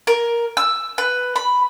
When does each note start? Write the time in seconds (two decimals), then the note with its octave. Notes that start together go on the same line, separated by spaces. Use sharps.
0.07 A#4
0.57 E6
0.98 B4
1.36 B5